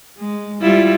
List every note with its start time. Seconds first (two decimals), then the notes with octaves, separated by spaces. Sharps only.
0.18 G#3
0.61 G3 E4 F4